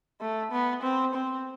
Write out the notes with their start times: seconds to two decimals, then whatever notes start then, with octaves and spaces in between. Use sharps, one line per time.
0.21 A3
0.51 B3
0.83 C4
1.14 C4